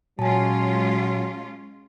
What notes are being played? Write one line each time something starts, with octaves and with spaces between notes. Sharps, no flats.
A#2 F#3 G#3 C#4 F4 G#5 A5